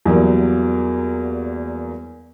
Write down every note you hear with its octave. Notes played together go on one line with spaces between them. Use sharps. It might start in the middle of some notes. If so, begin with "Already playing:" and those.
E2 F#3 G3 A#3